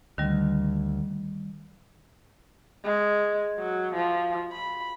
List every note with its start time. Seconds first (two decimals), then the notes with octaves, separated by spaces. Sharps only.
0.18 D2 D#3 G3
2.85 G#3
3.59 F#3
3.94 F3
4.52 B5